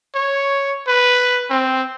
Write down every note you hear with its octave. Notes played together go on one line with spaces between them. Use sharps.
C#5
B4
C4